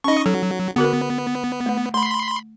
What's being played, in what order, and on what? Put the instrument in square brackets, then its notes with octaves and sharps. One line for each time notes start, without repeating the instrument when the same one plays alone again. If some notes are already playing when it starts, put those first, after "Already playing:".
[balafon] C#4 D#4 [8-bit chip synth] D#5 C#6
[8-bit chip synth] F#3 [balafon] A4
[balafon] D3 F#4 A#4 [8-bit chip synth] B3
[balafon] A3
[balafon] A3 [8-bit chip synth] B5 C6